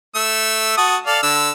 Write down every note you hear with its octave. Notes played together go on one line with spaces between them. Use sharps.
A3 E6
F#4 A5 D#6
A4 D5 F5
D3 E6